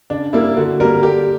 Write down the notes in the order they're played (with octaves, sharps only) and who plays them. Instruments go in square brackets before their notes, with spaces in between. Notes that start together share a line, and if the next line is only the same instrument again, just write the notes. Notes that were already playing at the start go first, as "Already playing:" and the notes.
[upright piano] C#3 D4
G3 A#3 E4
D3 F#4
G3 A#3 A#4
D3 G4